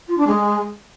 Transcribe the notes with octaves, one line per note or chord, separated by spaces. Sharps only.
F4
D4
G#3